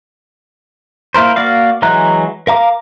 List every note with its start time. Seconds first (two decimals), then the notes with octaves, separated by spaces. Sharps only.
1.14 A#3 E4 A#4 C5
1.36 A#3 F#4 D5 F5
1.82 E3 F#3 G#3 A#5 F#6
2.47 A#4 F5 A#5 D6